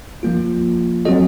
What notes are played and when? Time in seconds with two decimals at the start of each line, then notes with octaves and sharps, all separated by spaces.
0.23 F3 A#3 F4
1.05 F#3 C4 F#4 A4 D#5